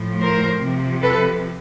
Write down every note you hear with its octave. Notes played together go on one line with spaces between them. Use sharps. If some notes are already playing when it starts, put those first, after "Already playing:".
Already playing: A2 F3
A#4 C5
C3 F3
A4 B4